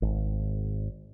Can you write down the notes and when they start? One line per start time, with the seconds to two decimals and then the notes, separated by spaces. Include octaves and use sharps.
0.02 G#1